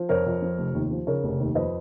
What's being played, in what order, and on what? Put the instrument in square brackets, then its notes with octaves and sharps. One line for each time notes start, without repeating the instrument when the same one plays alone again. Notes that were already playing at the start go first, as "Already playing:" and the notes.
Already playing: [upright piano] F3
F2 A#4 C#5
F2
F3
F1
D#2
F3
C#3 A#4 C#5
F1
D#2
F2 B4 D#5